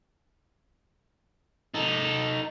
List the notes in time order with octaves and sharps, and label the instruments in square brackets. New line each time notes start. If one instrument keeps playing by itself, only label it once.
[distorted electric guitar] D#4 A4